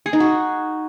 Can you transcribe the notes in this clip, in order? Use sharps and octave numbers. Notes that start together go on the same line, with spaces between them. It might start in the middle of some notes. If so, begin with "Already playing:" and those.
G#4
D#4
F#4